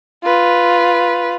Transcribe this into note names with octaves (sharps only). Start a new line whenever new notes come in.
F4 B4